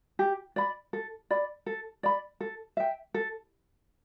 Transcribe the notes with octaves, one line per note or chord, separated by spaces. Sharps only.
G4
D5 B5
A4
D5 B5
A4
D5 B5
A4
E5 G5
A4